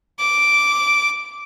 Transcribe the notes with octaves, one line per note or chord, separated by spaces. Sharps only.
D6